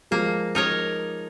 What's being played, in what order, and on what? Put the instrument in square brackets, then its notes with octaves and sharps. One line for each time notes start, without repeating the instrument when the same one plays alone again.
[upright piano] F3 G#3 [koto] A#3
[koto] D#4 A#4 C#5